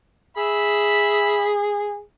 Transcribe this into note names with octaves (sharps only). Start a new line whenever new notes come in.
G#4 E5 B5